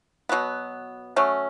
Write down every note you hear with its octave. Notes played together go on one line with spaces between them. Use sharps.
B2 F#3 B3
F#3 A3 C#4